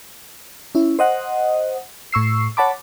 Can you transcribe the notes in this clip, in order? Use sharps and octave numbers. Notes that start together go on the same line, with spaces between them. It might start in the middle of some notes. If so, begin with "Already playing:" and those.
C#4 E4
C5 D#5 F#5
A2 C#6 E6 C7
C#5 F#5 A5 B5 D6